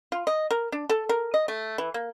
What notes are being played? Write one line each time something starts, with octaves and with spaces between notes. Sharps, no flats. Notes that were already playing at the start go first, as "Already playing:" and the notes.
F4
D#5
A#4
D4
A4
A#4
D#5
A3
E3
A#3